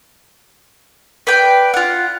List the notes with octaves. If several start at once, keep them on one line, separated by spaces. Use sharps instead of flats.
B4 D5 G5
F4 F#5